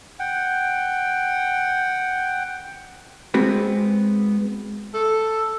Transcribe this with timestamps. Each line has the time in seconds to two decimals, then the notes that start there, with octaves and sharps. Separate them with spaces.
0.19 F#5 G5
3.34 G#3 B3 C4 F#4 B4
4.94 A4